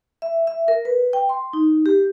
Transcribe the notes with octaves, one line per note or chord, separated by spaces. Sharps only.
E5
E5
A#4
B4
G5
C6
D#4
G4